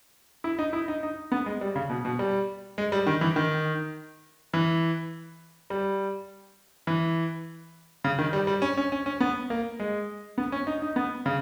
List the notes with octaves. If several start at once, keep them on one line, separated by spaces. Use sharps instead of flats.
E4
D#4
E4
D#4
D#4
B3
G#3
G3
C#3
B2
B2
G3
G#3
G3
D#3
E3
D#3
E3
G3
E3
C#3
D#3
G3
G3
C#4
C#4
C#4
C#4
B3
A#3
G#3
B3
C#4
D#4
D#4
B3
C#3